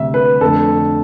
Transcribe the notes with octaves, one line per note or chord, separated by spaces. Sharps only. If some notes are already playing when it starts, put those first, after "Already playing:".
Already playing: D2 C3 G3 E5
B4
F2 D3 A3 A4